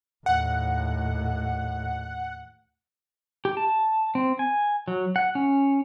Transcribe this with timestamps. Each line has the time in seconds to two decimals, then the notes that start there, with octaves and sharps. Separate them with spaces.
0.26 D#2 A2 F#5
3.45 G4
3.57 A5
4.15 C4
4.39 G#5
4.88 F#3
5.16 F#5
5.35 C#4